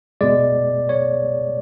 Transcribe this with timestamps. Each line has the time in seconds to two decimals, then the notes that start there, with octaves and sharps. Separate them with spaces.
0.21 B2 G#3 D5
0.89 C#5